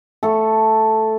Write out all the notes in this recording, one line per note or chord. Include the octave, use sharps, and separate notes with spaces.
A3 A4